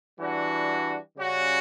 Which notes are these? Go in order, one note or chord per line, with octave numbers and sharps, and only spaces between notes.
E3 G3 D4 F#4
C#3 G3 C#4 F#4